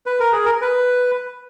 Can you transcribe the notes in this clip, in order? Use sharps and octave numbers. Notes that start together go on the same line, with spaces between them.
B4
A#4
G#4
A#4
B4